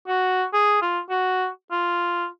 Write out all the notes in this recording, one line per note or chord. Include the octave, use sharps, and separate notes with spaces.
F#4
G#4
F4
F#4
F4